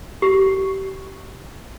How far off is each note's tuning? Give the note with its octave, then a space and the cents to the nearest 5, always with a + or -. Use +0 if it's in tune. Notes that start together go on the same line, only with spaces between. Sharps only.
G4 -30